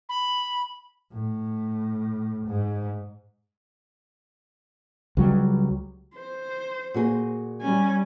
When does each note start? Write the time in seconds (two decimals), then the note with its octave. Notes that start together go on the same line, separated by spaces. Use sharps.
0.09 B5
1.13 A2
2.47 G#2
5.17 C#2 F#3 G3
6.14 C5
6.94 A#2 F#4 G#4
7.62 G3 C#4 G#5